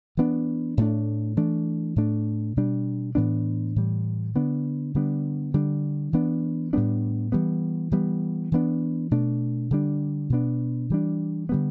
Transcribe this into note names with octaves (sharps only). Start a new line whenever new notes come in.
E3 B3 D4
A2 A3 D4
E3 A3 D4
A2 A3 D4
B2 G3 D4
A2 E3 B3 D4
A2 E3 G3
D3 B3 D4
D3 G3 B3 D4
D3 G3 D4
E3 B3 D4
A2 G3 B3 D4
E3 G3 B3
E3 G3 B3
E3 B3 D4
B2 A3 D4
D3 G3 D4
B2 B3 D4
E3 G3 D4
D3 G3 B3